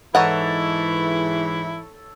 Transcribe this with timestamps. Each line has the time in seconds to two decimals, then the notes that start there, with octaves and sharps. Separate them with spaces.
0.15 G#2 E3 D#4 E4 A4 C#5 D#5 F#5